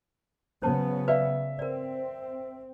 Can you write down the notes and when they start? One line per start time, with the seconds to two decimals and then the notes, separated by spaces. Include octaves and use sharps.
0.62 C#3 F#3 B3 C#4 C5 A5
1.08 B4 D5 E5 F5
1.59 C4 A#4 D5